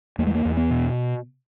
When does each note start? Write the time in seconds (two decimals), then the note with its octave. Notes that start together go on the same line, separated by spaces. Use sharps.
0.18 E2 A#3
0.27 G#3
0.35 A#3
0.45 E2
0.57 B3
0.71 B2